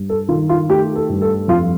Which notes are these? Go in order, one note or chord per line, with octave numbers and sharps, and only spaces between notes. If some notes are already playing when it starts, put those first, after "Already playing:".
Already playing: G2
A4
D#3 F4
F4
A3 G4
A4
G2
A4
F2 F4